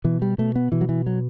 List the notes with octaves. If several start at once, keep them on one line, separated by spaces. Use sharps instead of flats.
B2 E3
G3
B2 A3
B3
B2 E3
F#3
E3
F#3